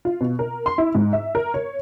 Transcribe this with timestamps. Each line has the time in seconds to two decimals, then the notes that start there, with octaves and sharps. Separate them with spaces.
0.05 F4
0.21 B2
0.39 A#4
0.66 C6
0.78 E4
0.95 G#2
1.13 E5
1.35 A#4
1.54 C#5